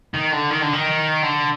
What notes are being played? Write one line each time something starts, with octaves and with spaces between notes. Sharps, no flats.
D#3
D3
D#3
D3
D#3
D3